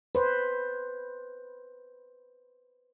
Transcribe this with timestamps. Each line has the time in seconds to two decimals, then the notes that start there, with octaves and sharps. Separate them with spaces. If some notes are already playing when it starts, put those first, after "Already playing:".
0.15 B4 C5